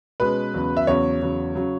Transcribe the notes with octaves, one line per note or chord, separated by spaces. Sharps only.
B2 G#3 C#4 B4
E2 C#3 F#3
E5
E2 C#3 F#3 C#5
E2 C#3 F#3
C#3 F#3